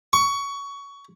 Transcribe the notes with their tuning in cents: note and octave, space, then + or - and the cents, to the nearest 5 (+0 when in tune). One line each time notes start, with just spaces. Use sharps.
C#6 +20